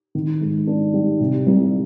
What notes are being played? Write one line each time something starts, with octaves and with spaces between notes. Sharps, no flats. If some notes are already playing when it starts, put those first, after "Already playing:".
D#3
G#2
D4
G3
C3
C2